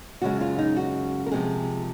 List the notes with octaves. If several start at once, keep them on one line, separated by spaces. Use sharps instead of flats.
F#2 C#3 G#3 F#4
F4
D#4
F#4
A#4
C3 F3 G#3 G#4